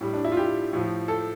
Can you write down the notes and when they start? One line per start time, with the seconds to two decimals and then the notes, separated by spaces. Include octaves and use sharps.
0.01 A2 G3
0.13 D4
0.25 E4
0.32 F4
0.37 G4
0.73 A2 F3
1.08 A4